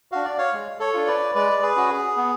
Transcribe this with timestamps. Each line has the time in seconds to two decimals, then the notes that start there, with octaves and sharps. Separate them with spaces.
0.12 D4 F#4 F5
0.24 D5
0.38 C#5 F5
0.53 G#3
0.79 A4 C#5
0.94 D4 F4
1.07 B4 D5
1.35 G#3 B4 D5
1.62 G#4 B4
1.76 C#4 F#4
1.90 G#4
2.17 B3